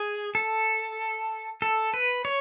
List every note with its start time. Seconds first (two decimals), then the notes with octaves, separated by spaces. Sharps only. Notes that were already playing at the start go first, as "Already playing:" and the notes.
Already playing: G#4
0.35 A4
1.62 A4
1.94 B4
2.25 C#5